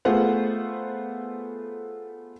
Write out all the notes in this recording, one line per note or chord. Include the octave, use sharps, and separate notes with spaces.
A3 B3 F4 G#4 C5 F#5